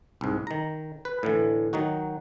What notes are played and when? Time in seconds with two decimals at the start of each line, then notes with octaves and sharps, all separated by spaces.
0.21 C2 G#2
0.47 D#3 A#5
1.05 B4
1.23 A2 D3 E3
1.73 D#3 F#3 D#4 F#4